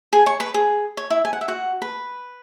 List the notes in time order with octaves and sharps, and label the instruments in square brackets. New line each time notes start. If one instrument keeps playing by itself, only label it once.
[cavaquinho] G#4 G#5
C#5 C#6
B4 B5
G#4
C#5
E4 E5
G#5
F#5
E5
F#4 F#5
B4 B5